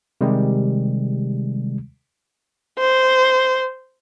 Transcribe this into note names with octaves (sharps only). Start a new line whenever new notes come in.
C3 D#3 G3 G#3
C5